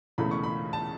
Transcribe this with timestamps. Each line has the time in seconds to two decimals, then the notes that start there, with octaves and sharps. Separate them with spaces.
0.18 E1 E2 C#3 E3 A3 B5
0.31 C#6
0.43 B5
0.73 A5